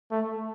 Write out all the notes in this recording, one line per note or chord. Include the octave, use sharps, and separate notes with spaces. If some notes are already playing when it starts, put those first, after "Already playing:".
A3